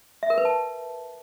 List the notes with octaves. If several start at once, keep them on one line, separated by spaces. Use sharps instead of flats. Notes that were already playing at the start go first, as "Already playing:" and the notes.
E5
A#4
B4
A5